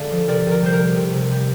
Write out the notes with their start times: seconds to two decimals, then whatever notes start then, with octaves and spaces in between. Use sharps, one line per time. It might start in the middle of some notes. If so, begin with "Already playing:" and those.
Already playing: D3 G#3 D5 F5
0.11 F3
0.27 C3 A#4 D5
0.46 C3
0.51 A#4
0.62 G3 C5
0.73 A#4
0.80 G3
0.96 C3
1.14 C3
1.31 G3